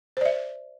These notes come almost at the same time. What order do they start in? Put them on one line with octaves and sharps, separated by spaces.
C5 D5 E5